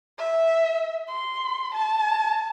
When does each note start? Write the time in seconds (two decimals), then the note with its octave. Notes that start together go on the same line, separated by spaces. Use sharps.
0.18 E5
1.09 C6
1.74 A5